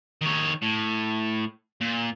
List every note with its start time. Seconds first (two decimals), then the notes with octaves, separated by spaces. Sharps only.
0.21 D#3 C#5
0.62 A2
1.81 A#2